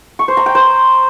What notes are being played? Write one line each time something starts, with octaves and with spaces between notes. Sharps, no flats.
C#6
C5
A#5
G5
C5